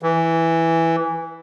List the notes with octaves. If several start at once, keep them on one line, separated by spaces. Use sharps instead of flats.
E3